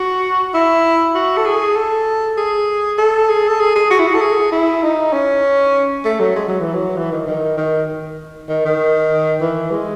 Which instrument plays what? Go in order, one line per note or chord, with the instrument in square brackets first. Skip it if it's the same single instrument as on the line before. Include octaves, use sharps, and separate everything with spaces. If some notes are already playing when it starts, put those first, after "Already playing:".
Already playing: [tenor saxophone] F#4
E4
F#4
A4
G#4
A4
G#4
A4
G#4
A4
G#4
G#4
F#4
E4
F#4
A4
G#4
E4
D#4
C#4
A3
F#3
G#3
F#3
E3
F#3
E3
D#3
D#3
D#3
D#3
D#3
E3
G#3